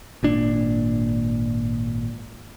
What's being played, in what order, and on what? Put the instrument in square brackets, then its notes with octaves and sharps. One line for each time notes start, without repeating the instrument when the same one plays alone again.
[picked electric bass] G#1 A#2 D4